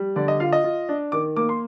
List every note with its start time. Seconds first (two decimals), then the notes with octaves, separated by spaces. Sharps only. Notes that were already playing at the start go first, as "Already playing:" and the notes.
Already playing: G3
0.16 D3 D5
0.28 D#5
0.40 F4 F5
0.52 D#5
0.64 F4
0.89 D4
1.12 D#3 D6
1.36 A#3 D6
1.49 C6